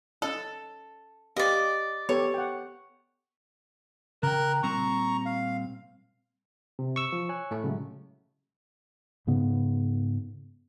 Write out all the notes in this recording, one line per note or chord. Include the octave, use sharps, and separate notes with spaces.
C#4 A4 D#5
G4 D5 D#5 F5
B3 G4 A4 C#5
F#5 G5
C#3 A#4 G5 F#6
A#2 G3 C4 A#5 C#6
F5
C3
C#6 E6
F3
C#5 G#5 F#6
A2 A3
C#3 F#3 G#3
G#2 C#3 B3